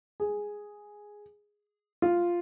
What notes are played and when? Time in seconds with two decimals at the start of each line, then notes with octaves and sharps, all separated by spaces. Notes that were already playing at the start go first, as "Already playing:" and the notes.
0.20 G#4
2.02 F4